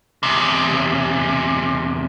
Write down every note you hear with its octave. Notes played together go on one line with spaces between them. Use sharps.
E2 C3